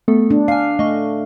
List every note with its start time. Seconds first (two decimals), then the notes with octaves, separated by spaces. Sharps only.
0.08 A3 B3 A4
0.30 D4
0.48 F5 G#5 C7
0.79 A3 D#5 C#6